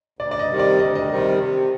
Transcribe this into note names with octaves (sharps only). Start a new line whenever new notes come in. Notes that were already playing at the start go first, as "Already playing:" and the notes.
D2 D5
D5
D#5
C3 D#3 G3
D5
D2 D#5
D#5
C3 D#3 G3
C3